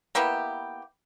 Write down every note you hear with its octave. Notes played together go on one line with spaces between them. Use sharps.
A#3 B3 E4 G4